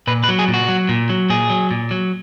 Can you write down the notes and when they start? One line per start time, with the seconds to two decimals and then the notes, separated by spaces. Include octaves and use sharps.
0.07 A#2 B4
0.24 B4
0.29 F#3
0.39 G#4
0.48 A#2
0.54 F#4
0.68 F#3
0.89 A#2
1.09 F#3
1.30 A#2 G#4
1.50 F#3
1.71 A#2
1.91 F#3